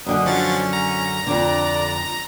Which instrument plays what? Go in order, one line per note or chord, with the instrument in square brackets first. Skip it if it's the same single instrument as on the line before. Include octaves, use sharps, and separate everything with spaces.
[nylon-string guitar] F#2 D3 F#5 [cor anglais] D#5
[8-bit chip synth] F3 F#3 A6 [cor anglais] C#4
[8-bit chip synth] A#5
[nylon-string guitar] F2 D3 [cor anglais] D5